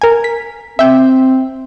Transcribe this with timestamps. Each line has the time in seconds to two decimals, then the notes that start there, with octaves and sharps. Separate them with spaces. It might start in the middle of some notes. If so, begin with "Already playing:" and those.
0.02 A#4 G#5
0.24 B6
0.79 C4 E5 G5